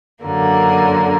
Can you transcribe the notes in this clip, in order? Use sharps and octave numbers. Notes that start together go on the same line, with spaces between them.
F#2 D3 A#3